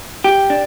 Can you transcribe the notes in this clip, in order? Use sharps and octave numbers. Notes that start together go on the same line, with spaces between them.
G4
D4